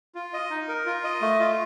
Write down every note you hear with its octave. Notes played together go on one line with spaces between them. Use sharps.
F4
D#5
D#4
A#4
F4
D#5
A3
F4